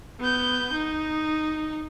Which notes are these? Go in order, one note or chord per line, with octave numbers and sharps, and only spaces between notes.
B3 G6
D#4